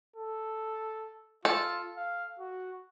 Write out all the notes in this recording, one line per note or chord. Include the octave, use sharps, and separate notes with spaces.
A4
F4 A4
F5
F#4